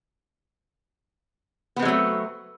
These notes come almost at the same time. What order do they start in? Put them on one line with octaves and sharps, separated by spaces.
B3 C4 G#3 F#3 A3